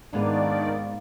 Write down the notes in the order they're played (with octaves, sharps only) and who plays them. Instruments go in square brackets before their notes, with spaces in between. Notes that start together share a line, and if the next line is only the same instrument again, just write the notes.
[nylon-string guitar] G#2 B3 B4 [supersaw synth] D#3 D5 [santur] A#3 [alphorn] D4